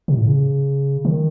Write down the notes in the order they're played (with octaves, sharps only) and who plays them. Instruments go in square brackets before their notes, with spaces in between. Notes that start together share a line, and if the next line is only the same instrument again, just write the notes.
[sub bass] C3
A2
C#3
D#3